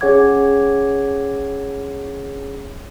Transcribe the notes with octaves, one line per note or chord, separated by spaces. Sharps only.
C#4 G#4 C#5 F#5 D6 G#6